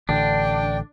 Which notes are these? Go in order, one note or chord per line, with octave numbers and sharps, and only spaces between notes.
A1 D3 D4 G5